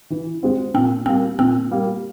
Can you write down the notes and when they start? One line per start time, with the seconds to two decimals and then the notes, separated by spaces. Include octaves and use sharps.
0.10 E3
0.43 G#3 C4
0.74 A#2 C4
1.06 G3 A#3 C4
1.39 A#2 C4
1.71 G3 A#3